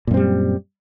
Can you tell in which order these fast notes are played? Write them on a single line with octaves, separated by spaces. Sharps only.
A#2 F#2 C4 G3